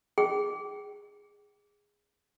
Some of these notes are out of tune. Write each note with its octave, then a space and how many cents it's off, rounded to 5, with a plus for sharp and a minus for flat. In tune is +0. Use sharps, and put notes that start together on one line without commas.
G#4 -10 G5 -30